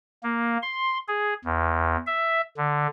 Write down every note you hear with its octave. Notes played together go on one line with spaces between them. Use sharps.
A#3
C6
G#4
E2
E5
D3